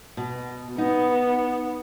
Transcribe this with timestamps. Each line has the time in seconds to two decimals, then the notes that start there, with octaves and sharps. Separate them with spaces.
0.17 B2
0.78 B3 D#4